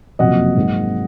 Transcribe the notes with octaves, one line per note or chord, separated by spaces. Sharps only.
F#1 F2 C3 F#3 A#3 D#5 F#5
G#1 G#2 F#3 A#3